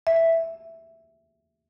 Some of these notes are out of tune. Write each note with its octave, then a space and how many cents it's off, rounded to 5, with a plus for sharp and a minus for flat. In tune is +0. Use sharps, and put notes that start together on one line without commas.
E5 +0